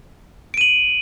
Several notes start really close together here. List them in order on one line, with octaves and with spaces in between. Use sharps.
D7 D#7 F#7